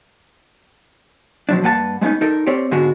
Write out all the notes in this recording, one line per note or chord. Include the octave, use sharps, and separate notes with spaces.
B2 F3 F#3 D4
G2 A#3 B4 F#5 A5
G#3 A3 B3 C#4 D#4
D#4 A4 A#4
C4 G4 C#5 D5
G#2 D3 G#3 B3 F#4